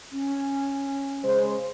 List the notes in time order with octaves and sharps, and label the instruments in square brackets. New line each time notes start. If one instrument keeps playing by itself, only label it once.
[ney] C#4
[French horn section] C#3 G#3 C5